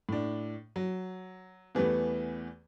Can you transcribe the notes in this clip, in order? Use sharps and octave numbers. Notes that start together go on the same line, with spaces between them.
A2 D4
F#3
E2 E3 G3 A3 B3